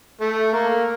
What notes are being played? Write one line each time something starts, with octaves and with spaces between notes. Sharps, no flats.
A3
A#3